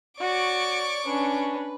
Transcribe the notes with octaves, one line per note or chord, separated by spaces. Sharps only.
F#4 C#5 D5 C#6 D6
C#4 D4 B4